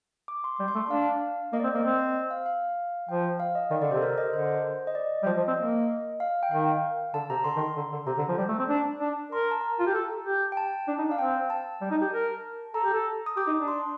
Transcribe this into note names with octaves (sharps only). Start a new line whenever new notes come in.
D6
C6
G3 D6
C6
A3
D4 F5
A#3 D#5
D5
C4
D#5
A#3
C4
F5
F5
F3 G5
F5
D#5
D#3 D5
D3 D5
C3 C5
A4
A#4
D#5
D3 C5
D#5
D5
G3
F3 D#5
F3
C4
A#3
F5
G5
D#3 F5
D3 A5
C3 A#5
D3 C6
D#3
D3
D3
C3 A#5
D3
F3
G3
A3
C4
D4
D4
A#4 C6
A#5
A5
A#5
F4
G4
A4 A5
G4
G5
A5
D4
D#4
D4 F5
C4 G5
A5
G3
D#4
G4
A#4
A4 A#5
G4
A4
D#6
G4 D6
D#4
D4
C6